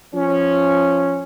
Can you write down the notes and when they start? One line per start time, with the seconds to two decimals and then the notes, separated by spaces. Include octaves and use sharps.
0.15 F3 C#4